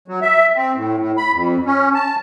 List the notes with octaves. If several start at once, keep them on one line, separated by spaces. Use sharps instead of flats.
F#3
E5
C4
A2
A2
B5
F2
C#4
A5